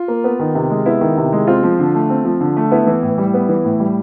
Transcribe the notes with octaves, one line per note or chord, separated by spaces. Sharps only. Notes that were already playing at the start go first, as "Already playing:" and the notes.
Already playing: F4
A#3
B3
D#3
C3
G#3
B3 E4
D#3
C3
G#3
C4 F4
F3
D3
A3
C4
F3
D3
A3
B3 E4
E3
A2
G3
B3
E3
A2
G3